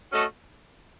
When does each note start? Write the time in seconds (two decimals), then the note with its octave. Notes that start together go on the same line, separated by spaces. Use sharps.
0.12 A3 C#4 F#4 A4 D#5